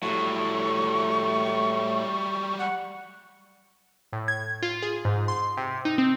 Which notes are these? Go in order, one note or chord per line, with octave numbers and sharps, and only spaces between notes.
A2 F#3 G3 C#6
F#5
A2
G#6
F4
G#4
G#2
C6
C3
D#4
C4